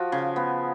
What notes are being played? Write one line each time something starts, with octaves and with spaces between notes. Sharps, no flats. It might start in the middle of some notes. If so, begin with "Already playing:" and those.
Already playing: F3 F#4
C#3
B3